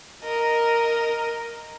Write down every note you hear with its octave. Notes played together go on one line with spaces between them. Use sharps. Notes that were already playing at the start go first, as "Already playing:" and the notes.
A#4 D#5